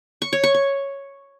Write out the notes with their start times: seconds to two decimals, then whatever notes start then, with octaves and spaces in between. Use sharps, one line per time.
0.22 C#6
0.33 C#5
0.44 C#6
0.54 C#6